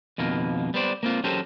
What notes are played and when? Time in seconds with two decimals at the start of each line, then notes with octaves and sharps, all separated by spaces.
0.18 F2 B2 D#3 A#3
0.74 G3 B3 C5 D5
1.03 A#3 C4 F4
1.24 F#3 C#4 G4 A4 A#4 C5